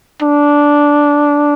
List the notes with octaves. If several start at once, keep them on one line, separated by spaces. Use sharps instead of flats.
D4